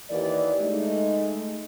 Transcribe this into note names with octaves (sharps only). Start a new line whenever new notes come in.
D#2 E3 A#3 G4 D5
G#3 A3 D#4